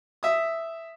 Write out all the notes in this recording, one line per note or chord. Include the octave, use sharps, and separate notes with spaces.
E5 D#6